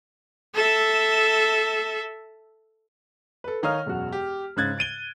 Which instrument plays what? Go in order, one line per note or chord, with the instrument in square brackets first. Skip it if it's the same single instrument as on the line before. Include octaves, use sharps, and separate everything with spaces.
[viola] A4 E5
[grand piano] A4 B4
D#3 D#4 C#5 F5 D#6 F6
E1 F#2 F#4
G4
G#2 C#3 F#6 G#6 A6
A6 D7 D#7 G7